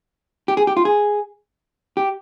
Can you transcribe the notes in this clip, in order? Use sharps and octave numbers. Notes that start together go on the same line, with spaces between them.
G4
G#4
G4
F4
G#4
G4